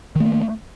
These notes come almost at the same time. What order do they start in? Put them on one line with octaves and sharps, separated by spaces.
D#3 A3 A#3